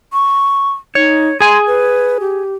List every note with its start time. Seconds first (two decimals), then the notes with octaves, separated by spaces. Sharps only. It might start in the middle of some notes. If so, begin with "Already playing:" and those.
0.13 C#6
0.95 D#4 C#5
1.40 G#4 G#5 C6
1.67 B4
2.20 G4